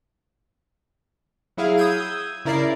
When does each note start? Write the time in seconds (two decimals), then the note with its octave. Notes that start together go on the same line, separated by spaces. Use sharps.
1.57 F#3 E4 G#4 F5
1.77 D#6 E6 G6 G#6 D#7
2.45 C#3 E4 A#4 D5 C7